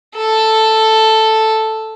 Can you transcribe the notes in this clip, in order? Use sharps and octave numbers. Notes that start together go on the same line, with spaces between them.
A4